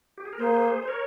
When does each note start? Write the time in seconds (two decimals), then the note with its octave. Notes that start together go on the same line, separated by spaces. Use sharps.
0.18 G4
0.25 G#4
0.33 A#4
0.39 A#3 G#4 C5
0.82 C5
0.88 A#4 C#5